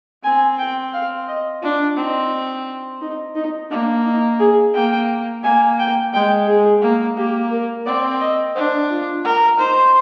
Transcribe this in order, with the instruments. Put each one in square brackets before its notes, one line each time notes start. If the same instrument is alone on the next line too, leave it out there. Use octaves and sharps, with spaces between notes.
[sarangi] C4 [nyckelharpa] G#5
[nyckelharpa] G5
F5
D#5
[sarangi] D4 [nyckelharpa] F4
[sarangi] C4 [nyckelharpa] D#4
[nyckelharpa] D#4
D#4
[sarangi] A#3 [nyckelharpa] D4
[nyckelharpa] D#4
G#4
[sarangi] A#3 [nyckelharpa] G5
[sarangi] A#3 [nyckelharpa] G#5
[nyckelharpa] G5
[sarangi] G#3 [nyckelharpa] G5
[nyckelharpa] G#4
[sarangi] A#3
[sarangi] A#3 [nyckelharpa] G4
[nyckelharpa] A#4
[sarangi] C4 [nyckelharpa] D5
[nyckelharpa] D#5
[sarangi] D4 [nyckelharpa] C5
[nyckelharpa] F4
[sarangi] A#4
[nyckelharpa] D#4 [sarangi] C5